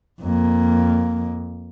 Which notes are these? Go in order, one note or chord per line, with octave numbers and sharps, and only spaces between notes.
F2 A#3